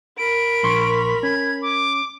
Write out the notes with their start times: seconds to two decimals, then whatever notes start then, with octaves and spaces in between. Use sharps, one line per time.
0.18 A#4 B5 D7
0.63 A#1 C6 C#6
1.23 C#4 G#6
1.62 D6